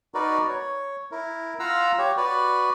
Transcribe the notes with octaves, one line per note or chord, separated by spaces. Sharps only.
D#4 F#4 A#4 B4 D5
C#5
E4 A#4
F4 F5 F#5 A#5 E6
G4 C#5
F#4 B4 D5